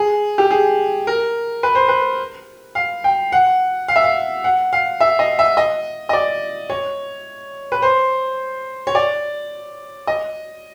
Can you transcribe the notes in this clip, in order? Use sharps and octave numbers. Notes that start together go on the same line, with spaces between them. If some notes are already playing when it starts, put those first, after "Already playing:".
Already playing: G#4
G4
G#4
A#4
B4
C5
B4
F5
G5
F#5
F5
E5
F5
F#5
F5
E5
D#5
E5
D#5
D#5
D5
C#5
B4
C5
C#5
D5
D#5